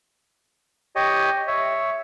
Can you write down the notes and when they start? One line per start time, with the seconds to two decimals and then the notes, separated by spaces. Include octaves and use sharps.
0.96 G4 C#5 D#5
1.48 C#5 E5